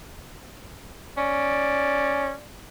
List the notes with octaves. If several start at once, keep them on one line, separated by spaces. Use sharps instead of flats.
C#4 D5